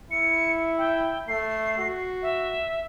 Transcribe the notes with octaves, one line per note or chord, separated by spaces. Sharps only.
E4 C#7
G5
A3 C7
F#4
E5